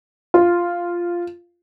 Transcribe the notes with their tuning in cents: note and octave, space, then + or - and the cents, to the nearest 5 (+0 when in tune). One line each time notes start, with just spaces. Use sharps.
F4 -5